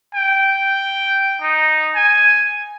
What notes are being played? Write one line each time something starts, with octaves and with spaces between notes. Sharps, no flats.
G5
D#4
G#5